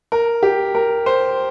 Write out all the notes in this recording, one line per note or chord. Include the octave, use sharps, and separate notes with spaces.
A#4
G4
A#4
C5